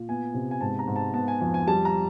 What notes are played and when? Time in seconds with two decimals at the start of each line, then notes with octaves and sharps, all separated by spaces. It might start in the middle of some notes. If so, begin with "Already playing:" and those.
Already playing: A#2
0.09 B3 G#5
0.34 C3
0.51 G#5
0.61 G#2 A5
0.79 A#5
0.87 G#2
0.96 A5
1.14 B3 A5
1.28 G#5
1.41 F2 G#5
1.54 G#5
1.68 G3 A5
1.85 A#5